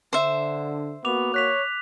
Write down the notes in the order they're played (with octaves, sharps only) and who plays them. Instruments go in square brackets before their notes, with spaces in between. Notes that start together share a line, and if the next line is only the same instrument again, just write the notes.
[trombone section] D3 [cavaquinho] C5 E5
[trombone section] A#3 F#4 [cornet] B3 [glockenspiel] D6 F7
[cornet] C#5 [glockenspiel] F#6 B6 F7